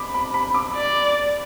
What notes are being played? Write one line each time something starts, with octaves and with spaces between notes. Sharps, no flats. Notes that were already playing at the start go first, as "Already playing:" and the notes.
Already playing: B5 D6
B5
B5
D6
D5